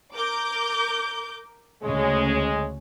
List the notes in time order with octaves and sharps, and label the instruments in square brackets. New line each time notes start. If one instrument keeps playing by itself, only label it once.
[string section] A#4 D6 G6
[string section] D2 C#3 C#4 [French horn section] G#3